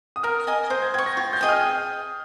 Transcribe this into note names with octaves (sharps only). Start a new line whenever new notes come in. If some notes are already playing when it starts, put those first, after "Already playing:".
D#6
A#4 F6
D#5 G#5 D#6
C5 G6
G#6
G5 C#6 G#6
A#6
F4 G#6
G6
G#4 D#5 G5 D#6
F6